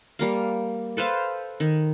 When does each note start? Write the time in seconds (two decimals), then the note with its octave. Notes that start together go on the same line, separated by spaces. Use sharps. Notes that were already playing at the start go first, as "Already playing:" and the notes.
0.19 G3 A#3 F5
0.97 A4 B4 C5 F5
1.60 D#3